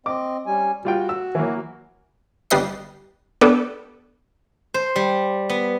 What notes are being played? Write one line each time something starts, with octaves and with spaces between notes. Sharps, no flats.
C4 D#5 D6
G3 C#4 G#5
G3 F4 F#4 G5
E6
E3 F#3 A#3
G1 G3 B4 D#5 C7
B3 D4 G4 A4
C5
G3
B3